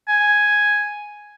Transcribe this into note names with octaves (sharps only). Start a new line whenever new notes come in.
G#5